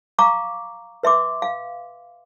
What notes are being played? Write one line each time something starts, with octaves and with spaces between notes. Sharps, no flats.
F5 A#5 C#6 D6
B4 E5 C6 D6
F5